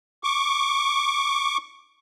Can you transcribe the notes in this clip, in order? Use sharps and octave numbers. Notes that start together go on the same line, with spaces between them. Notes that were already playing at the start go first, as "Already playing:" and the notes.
C#6 D6